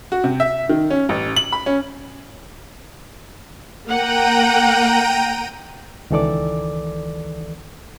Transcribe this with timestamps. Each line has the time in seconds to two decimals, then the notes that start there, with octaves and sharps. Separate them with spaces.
0.12 F#4
0.24 C3
0.40 E5
0.69 D#3
0.90 C#4
1.09 A1
1.36 F#7
1.53 B5
1.66 C#4
3.86 A#3 F#5 G5 A#5 D#7
6.11 C#2 D#3 E3 A4 D5 D6